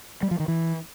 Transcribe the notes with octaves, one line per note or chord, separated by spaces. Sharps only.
G3
F3
D#3
E3